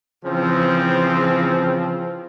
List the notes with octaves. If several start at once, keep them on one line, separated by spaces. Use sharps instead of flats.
C#3 E3 F3 C4